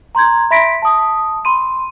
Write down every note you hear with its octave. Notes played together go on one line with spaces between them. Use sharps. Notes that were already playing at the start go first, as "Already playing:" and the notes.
A#5 C6 G6 G#6
E5 B5 C6 A#6 B6 D7
A5 D#6
B5 C6 D#7